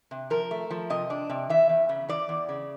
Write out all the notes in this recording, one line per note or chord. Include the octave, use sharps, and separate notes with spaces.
C3
F3 A#4
A3
F3
C3 D#5
D4
C3
E3 E5
E2
C#3
E3 D5
E2
C#3